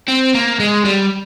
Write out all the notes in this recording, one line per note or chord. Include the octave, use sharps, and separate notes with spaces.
C4
A#3
G#3
G3